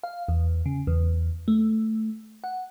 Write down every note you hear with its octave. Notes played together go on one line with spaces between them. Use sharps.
F5
E2
C#3
E2
A3
F#5